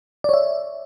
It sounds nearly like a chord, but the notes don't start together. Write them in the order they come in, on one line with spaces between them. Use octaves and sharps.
D5 C#5 E5